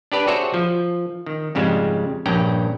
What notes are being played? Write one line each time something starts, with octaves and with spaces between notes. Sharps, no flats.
D4 G4 B4 D5
F#4 G#4 A4 C5 C#5 E5
F3
D#3
F2 G#2 C#3 G3 G#3
A#1 G2 C#4 G5 A#5